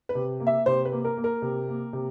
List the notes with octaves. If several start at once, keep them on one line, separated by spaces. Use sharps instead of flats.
B4
C3
A#3
E5
C3 C5
B4
A#3
A#4
A#3
A#4
C3
A#3
C3